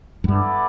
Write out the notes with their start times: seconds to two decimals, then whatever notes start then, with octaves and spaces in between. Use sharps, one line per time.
0.24 F#2
0.28 G2 B3 E4 A4 D5